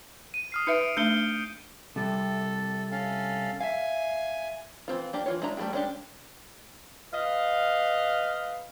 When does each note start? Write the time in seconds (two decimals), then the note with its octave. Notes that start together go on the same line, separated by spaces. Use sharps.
0.34 D#7
0.52 D#6 F6 C7
0.67 D#4 B4 E5 C#7 D7
0.97 A3 D4 D#4 G6 C#7 G7
1.96 C3 G3 A4
2.91 C#4 A4 F5
3.61 E5 F5 G#5
4.88 E3 F#3 C4 F4
5.13 A#3 D4 G4
5.26 E3 F4 C#5
5.42 G#3 D4 E4 A#5
5.57 G3 A3 F4 G#4 G5
5.73 G#3 C#4 D4 G4
7.13 B4 D#5 F5